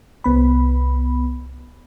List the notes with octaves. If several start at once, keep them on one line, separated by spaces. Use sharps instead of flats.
C2 B3 B5